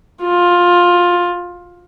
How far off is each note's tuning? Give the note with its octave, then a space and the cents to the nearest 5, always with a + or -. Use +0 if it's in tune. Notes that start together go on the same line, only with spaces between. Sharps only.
F4 +15